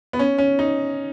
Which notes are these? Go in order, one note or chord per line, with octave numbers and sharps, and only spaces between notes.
B3
C#4
C#4
D#4